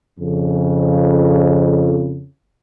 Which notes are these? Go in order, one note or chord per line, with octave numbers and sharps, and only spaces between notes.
F2 C#3